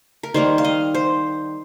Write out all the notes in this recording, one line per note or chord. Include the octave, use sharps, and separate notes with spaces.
A#4
D#3 G3 A#3 C5
F5
D#5
C5